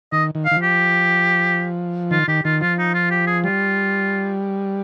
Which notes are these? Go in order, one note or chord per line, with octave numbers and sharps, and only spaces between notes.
D#3 D#5
D#3
F5
D#3
F3
G4
D#3 F4
D#3 G4
D#3 F4
F3 F4
D#4
F4
G4
G#4
G3 F4